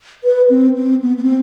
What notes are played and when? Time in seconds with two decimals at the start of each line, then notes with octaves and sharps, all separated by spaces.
0.24 B4
0.50 C4
0.76 C4
1.02 B3
1.17 B3
1.23 C4